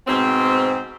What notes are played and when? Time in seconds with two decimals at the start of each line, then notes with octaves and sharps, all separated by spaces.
0.07 G#2 B2 C4